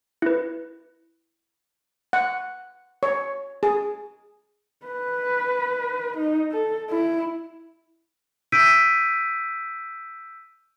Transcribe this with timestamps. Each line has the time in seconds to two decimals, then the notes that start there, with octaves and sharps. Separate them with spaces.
0.22 E4 B4
2.13 F#5
3.03 C#5
3.63 G#4
4.86 B4
6.17 D#4
6.51 A4
6.90 E4
8.52 E6 G6 B6 D7 D#7